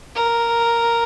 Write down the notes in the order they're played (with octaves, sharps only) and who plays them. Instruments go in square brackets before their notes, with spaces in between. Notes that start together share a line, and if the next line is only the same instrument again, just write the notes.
[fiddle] A#4